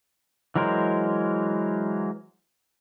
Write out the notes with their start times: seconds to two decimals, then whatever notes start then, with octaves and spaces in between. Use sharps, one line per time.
0.56 E3 F#3 G#3 A#4 C5